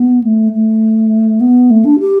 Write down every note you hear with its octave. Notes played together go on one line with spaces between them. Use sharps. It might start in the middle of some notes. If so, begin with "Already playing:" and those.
Already playing: B3
A3
A3
B3
A3
D4
G4